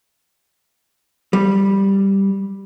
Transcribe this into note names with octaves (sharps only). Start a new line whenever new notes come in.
G3